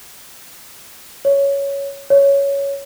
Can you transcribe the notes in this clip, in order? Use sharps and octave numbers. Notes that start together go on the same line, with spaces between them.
C#5
C#5